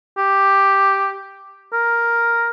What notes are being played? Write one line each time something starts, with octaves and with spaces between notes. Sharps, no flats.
G4
A#4